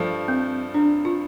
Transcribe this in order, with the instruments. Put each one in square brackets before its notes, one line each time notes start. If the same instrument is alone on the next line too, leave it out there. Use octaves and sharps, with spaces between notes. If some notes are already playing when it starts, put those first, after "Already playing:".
Already playing: [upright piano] G2 F3 A3
[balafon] C4
D4
F4